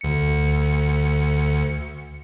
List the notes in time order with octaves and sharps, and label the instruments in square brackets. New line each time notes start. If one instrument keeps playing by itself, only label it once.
[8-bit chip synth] D2 C#7